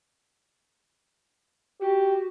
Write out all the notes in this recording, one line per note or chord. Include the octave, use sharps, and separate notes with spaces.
F#4 G4